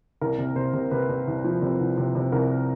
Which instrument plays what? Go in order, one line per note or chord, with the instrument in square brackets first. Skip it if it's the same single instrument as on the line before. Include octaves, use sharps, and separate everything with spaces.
[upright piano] C2 A#4
C3
C3 C5
C3
C3 B4
C3
C2
F3
C3
C2
C3
C3
C2 A#4